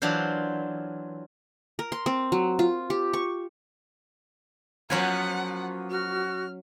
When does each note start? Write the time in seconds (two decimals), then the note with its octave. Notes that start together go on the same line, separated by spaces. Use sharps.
0.02 E3 F#3 D4 F4 C5
1.79 A#4
1.92 C6
2.06 C4
2.32 F#3
2.59 F4
2.90 G4
3.13 C#6
4.90 F3 F#3 A#3 B3 C#4 F#5 G#5
5.91 F#4 F6